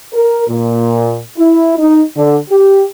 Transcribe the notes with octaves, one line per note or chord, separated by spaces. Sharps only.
A#4
A#2
E4
D#4
D3
G4